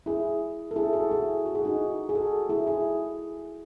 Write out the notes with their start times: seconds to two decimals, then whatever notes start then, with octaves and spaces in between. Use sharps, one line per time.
0.06 E4 G#4
0.71 A4
0.76 E4 G#4
0.93 F#4 A4
1.11 E4 G#4
1.46 F#4
1.55 G#4
1.65 D#4 F#4
2.09 G#4
2.15 F#4 A4
2.49 E4 G#4
2.67 E4 G#4